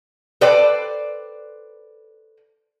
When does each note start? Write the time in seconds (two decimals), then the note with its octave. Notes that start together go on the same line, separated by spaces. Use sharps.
0.41 A4 B4 C5 D5 G5